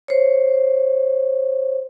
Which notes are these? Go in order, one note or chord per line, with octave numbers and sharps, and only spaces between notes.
C5 C#5